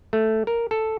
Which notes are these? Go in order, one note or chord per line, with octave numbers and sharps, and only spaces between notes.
A3
A#4
A4